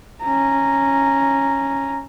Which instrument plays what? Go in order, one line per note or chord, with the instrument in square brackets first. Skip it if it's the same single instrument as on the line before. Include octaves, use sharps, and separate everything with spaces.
[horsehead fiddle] C#4 A#5